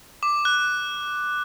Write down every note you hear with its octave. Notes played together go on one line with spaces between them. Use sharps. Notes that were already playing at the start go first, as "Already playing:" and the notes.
D6
F#6